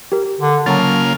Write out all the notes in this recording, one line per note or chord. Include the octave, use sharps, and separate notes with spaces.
G4 A#4
D3
C#3 F#3 A#3 F4 A5 A6